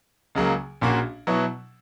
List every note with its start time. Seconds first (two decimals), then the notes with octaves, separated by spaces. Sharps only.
0.35 C#2 C#3 F#3 A#3
0.81 A#1 A#2 A#3 C#4 F#4
1.27 B2 F#3 B3 E4